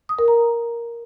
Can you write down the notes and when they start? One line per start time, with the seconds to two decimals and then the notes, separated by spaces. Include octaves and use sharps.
0.09 D#6
0.19 A#4
0.28 A#5